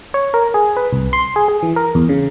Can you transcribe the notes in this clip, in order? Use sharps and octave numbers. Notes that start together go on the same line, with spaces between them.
C#5
A#4
G#4
B4
C2
C6
G#4
G#4
E3
A#4
E2
C#3